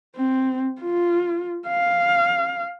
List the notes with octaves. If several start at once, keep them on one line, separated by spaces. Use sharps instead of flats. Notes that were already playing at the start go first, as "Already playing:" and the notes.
C4
F4
F5